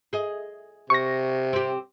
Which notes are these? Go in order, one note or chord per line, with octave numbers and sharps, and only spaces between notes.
G#4 D#5
C3 C#6 A#6
C4 G4